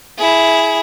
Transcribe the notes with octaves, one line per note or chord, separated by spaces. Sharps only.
E4 G#4